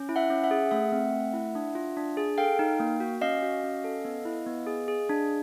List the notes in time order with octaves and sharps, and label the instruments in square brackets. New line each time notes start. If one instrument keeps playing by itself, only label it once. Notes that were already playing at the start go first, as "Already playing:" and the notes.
Already playing: [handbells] C#4
E4
E5 F#5
C#4
E5 F#5
G#4
A3 E5 F#5
C4
A3
E4
D4
F4
D4
G#4
A4 F5 G5
D#4
A#3
F#4
C#4 D#5 F5
F#4
C#4
A4
B3
E4
B3
G#4
G#4
D4